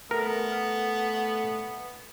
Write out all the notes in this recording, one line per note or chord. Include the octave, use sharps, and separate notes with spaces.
A3 B3 A#4